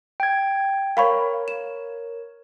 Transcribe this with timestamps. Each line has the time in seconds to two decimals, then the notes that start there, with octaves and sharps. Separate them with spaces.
0.20 G5 G#6
0.97 A#4 C#5 F5 B5 C#6
1.48 E7